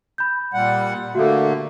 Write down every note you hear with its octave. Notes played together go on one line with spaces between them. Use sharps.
B5 G6
A#2 G3 F#5
D3 A3 A#3 F#4 G4 A4